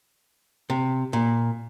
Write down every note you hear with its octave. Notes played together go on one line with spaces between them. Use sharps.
C3
A#2